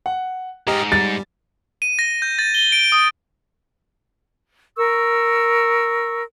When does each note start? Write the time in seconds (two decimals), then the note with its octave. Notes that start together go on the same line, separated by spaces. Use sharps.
0.06 F#5
0.67 D#2 G#2 G4 D#5 A#5 F6
0.92 G3 A6
1.82 D#7
1.99 A#6
2.22 G6
2.39 A6
2.54 G7
2.72 D7
2.92 D#6
4.77 A#4 C#6 E6